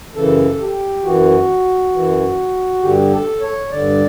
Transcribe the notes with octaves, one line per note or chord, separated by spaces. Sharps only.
F#2 C#3 E3 A4
G4
F#2 E3 F#4
F#2 E3
G2 D3 G4
A4
C#5
G2 D3 D5